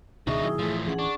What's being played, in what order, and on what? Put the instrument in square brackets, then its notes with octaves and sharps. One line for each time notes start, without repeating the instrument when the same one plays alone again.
[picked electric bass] C#2 B2 D#3 [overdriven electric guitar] D4 D#4 [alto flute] G#4 [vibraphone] E5 C#6
[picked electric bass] B2 D#3 F#3 [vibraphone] E4 D#6
[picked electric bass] A2 E3 [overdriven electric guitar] F3 A3
[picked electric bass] D1 E3 C#4 [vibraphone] G#4 F#5
[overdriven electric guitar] D4 [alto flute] C#6